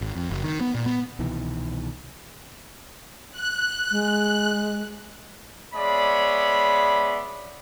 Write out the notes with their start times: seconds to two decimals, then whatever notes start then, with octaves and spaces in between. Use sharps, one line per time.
0.01 G#1
0.16 F2
0.30 F#1
0.44 D#3
0.61 B3
0.74 A#2
0.86 B3
1.19 C2 B2 D#3 E3
3.32 F#6
3.91 G#3
5.74 G#3 B3 C#5 D5 E5 B5